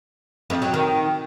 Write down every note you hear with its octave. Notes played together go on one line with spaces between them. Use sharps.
F2
F#3
D#3